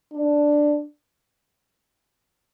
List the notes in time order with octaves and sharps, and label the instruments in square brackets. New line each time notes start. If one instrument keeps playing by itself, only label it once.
[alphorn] D4